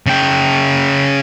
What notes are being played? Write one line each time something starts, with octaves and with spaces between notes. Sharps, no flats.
C#3 G5